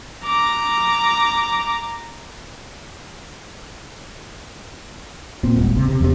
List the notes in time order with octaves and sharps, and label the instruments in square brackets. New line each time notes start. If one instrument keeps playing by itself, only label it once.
[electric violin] A#5 D6
[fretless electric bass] A#2 C4
D#1 G#1
C3
C3
E2 C3